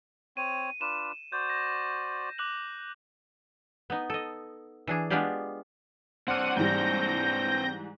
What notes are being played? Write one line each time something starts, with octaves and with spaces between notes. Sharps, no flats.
C4 C#5 D#7
D4 F4 B4 E7
F#4 C5 D5 G6
A#6
D6 F#6 F#7
B3 D#4
A4 D#5
E3 D4 G#4
G#3 B3 D4 F4 G4 D5
C4 D4 F#5 C6 D6 F6 D#7
G#2 E3 G3 G6 A#6